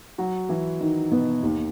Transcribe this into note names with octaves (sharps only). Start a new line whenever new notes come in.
F#3 F#4
E3 E4
D#3 D#4
B2 B3
D#2 D#3